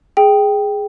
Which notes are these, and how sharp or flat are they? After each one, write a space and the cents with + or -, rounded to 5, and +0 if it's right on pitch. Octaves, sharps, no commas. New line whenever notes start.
G#4 +0 G5 +0